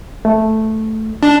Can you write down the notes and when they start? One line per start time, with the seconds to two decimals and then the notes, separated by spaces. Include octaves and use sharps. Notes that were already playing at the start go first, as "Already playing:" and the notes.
0.25 A3
1.23 D4